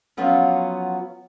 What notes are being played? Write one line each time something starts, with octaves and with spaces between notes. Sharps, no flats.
F3 F#3 B3 C#4 F4